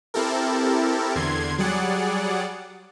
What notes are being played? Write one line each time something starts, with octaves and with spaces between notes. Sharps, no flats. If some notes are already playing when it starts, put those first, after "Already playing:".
C4 E4 G4 A4 A#4
E2 D3 C6 G#6
F#3 G3 G#4 D5 F#5